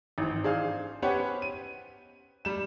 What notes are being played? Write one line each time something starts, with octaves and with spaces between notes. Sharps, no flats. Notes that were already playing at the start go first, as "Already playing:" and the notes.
G#1 E3 C4
D4 G#4 C5 F5
B3 C#4 G4 C5 C#5 F#5
D#7
G3 E7